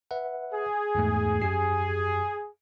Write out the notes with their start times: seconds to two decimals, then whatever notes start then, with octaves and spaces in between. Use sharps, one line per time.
0.11 B4 E5 F#5
0.53 G#4
0.95 E2 G#2 A3
1.42 F#2 G4 C7